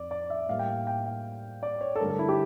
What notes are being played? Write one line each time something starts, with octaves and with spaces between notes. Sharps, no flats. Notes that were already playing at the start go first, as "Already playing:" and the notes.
Already playing: F2 D5
D5
E5
A2 G3 A#3 F5
G5
F5
G5
F5
D5
C#5
A4
G2 D3 A3 A#4
A4
E4
G4